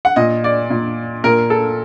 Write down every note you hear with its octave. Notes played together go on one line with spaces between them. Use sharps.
F#5
A#2 D#5
D5
A#2
A#2 A#4
A4